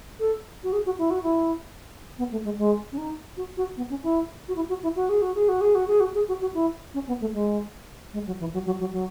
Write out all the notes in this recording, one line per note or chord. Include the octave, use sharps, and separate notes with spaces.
A4
F#4
G#4
F#4
E4
F#4
E4
B3
A3
G#3
G#3
C#4
D#4
F#4
F#4
B3
C#4
E4
F#4
E4
F#4
E4
F#4
G#4
F#4
G#4
F#4
G#4
F#4
G#4
F#4
G#4
F#4
F#4
E4
C#4
B3
A3
G#3
G#3
F#3
E3
F#3
F#3
F#3
F#3